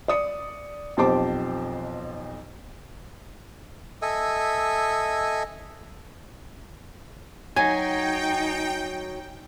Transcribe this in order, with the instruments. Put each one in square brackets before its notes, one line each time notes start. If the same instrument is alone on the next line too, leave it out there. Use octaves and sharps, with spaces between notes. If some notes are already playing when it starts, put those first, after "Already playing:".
[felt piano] D5 D#6 C#7
B1 F2 G4 C5 A5 D6
[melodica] A4 D#5 E5 G#5
[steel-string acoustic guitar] F#3 [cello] D#4 [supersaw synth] G5 [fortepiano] G#5